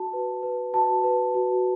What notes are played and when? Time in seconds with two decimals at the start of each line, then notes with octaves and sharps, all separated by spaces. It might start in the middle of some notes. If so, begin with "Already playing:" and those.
Already playing: F#4 A5
0.13 B4
0.43 B4
0.73 F#4 A5
1.04 B4
1.35 F#4